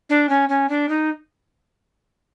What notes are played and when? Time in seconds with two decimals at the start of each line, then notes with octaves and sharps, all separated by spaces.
0.09 D4
0.29 C#4
0.49 C#4
0.69 D4
0.89 D#4